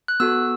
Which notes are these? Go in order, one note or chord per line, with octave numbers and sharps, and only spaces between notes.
F#6
B3 F#4 A4 E6